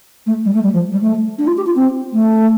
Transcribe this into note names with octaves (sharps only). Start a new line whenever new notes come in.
A3
G3
A3
G3
F3
G3
A3
D4
F4
G4
F4
C4
A3